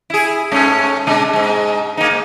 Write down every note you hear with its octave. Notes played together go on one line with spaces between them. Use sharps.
E4 G#4
G2 A3 C#4
B2 G#3 D4
G#2 G#3
A#3 D#4
G#2